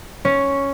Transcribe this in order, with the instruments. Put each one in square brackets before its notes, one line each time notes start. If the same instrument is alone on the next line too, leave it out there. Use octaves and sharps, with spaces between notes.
[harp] C#4